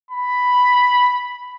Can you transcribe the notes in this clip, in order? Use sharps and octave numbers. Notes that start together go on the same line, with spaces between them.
B5